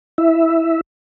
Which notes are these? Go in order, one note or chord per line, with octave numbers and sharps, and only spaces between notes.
E4 E5